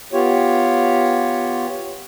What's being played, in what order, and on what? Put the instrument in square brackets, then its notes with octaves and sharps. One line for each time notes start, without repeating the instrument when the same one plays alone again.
[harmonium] B3 F4 G4 C#5